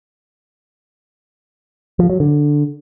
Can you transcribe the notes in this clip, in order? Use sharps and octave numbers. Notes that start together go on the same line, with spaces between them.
F3
F#3
D3